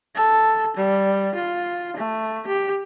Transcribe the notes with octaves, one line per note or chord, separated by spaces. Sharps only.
A4
G3
F4
A3
G4